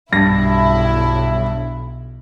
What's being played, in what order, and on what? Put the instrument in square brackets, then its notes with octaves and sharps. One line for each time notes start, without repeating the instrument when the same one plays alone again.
[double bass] B1 [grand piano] G2 A#6 [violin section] E4